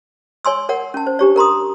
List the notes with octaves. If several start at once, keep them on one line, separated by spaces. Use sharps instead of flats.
C#5 G#5 C6 E6
A#4 C#5 F#5
C#4 A5
C5
D4 G4 C#5
A#4 A#5 C6 D#6